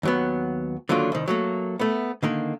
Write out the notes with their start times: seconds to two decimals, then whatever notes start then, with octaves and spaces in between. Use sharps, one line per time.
0.03 D#2 F#3 B3
0.89 D3 D#3 F#3 A#3 F4
1.12 C2 D#3
1.28 F#3 A3 A#3
1.79 A3 B3
2.23 D3 D#3 A#3